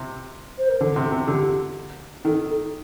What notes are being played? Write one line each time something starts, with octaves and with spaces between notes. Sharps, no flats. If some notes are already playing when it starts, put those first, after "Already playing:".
Already playing: C3
C5
A#4
D3 A4
C3
C3
D3 G4
D#3 A4
A4